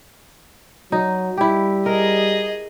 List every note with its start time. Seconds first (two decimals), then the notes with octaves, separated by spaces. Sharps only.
0.92 F#3 D#4
1.37 G3 E4 G4
1.86 G#4 A#4 D#5